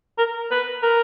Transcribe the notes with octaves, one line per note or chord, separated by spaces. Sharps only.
A#4
B4
A#4